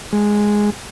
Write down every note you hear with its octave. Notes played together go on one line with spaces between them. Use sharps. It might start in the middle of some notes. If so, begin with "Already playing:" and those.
G#3